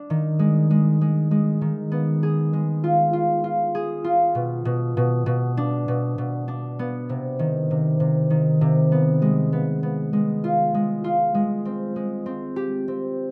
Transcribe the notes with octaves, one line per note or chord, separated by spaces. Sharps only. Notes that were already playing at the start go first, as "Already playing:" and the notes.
Already playing: D4
D#3
G#3
G#3
G#3
G#3
D#3
B3
G#4
G#3
F4
F4
F4
G#4
F4
B2
B2
B2
B2
D4
B2
B2
D4
B3
C3
D#3
C3
C3
D#3
C3
B3
G#3
B3
B3
G#3
F4
G#3
F4
G#3
C4
G#3
C4
G4
C4